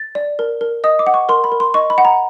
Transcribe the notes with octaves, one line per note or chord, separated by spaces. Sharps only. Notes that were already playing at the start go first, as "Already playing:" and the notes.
Already playing: A6
D5
A#4
A#4
D#5 D#6
D6
F#5
C#6
A#4 C6
B5
A#4
C6
D#5 C#6
B5
F#5
A#5